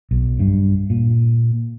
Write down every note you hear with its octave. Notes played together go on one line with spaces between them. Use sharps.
B1
G2
A#2